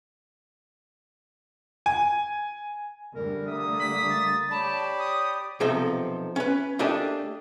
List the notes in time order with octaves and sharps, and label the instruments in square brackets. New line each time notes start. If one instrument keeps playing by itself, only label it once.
[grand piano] G#5
[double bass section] D3 G3 A3 [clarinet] A#4
[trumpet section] A#3 D#6 [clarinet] E5
[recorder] B6
A6
[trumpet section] G4 C#5 D5 [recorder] A5 [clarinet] B5
[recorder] D#6
[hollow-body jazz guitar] B1 C3 F3 D#4 A4 D#5
C#4 B4
A3 A#3 D4 G4 D#5 A5